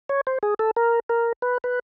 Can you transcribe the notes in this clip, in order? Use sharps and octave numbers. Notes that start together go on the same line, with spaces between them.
C#5
C5
G#4
A4
A#4
A#4
B4
B4